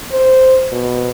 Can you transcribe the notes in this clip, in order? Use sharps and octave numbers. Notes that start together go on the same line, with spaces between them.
C5
B2